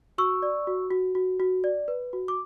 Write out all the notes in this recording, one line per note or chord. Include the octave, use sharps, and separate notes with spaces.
F#4 C#6 E6
D5
F#4
F#4
F#4
F#4
D5
B4
F#4
D6